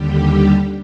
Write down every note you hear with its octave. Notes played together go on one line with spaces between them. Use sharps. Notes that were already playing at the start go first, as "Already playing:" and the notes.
Already playing: D#2 D3 G3 G4